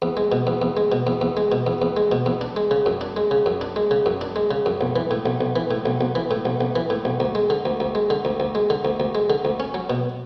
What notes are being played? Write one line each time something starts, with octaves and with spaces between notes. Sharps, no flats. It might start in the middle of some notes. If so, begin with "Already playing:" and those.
E2
G#3
B2
E2
E2
G#3
B2
E2
E2
G#3
B2
E2
E2
G#3
B2
E2
D4
G#3
C#3
F#2
D4
G#3
C#3
F#2
D4
G#3
C#3
F#2
D4
G#3
C#3
F#2
B1
E3
A2
B1
B1
E3
A2
B1
B1
E3
A2
B1
B1
E3
A2
B1
D2
G#3
D3
D2
D2
G#3
D3
D2
D2
G#3
D3
D2
D2
G#3
D3
D2
C#4
F#3
B2